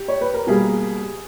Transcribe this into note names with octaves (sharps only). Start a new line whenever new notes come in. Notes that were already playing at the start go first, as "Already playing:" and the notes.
Already playing: G4
C#5
B4
A#4
B2 G3 A#3 G#4